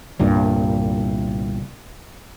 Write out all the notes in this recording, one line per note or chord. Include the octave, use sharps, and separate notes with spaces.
G1 C2 G2 A#2